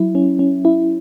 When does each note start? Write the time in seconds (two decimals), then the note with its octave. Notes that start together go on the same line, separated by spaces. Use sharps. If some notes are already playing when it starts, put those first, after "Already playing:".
Already playing: F#3 E4
0.15 C#4
0.39 C#4
0.65 E4